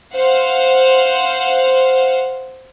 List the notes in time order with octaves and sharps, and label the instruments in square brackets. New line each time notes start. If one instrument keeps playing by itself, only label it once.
[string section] C5 F5 F#5